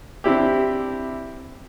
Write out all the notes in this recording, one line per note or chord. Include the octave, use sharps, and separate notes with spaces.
C4 D4 E4 G4